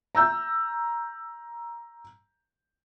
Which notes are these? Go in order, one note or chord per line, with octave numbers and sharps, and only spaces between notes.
A#5 E6 G6